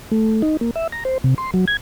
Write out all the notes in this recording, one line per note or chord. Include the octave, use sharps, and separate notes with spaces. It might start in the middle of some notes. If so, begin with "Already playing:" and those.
A3
D#4
A#3
E5
A#5
C5
C3
C6
F#3
G#6